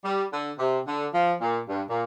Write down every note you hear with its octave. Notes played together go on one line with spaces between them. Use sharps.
G3
D3
C3
D3
F3
A#2
G2
A#2